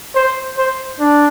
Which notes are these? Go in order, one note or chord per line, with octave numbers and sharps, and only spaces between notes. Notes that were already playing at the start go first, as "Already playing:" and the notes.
C5
C5
D4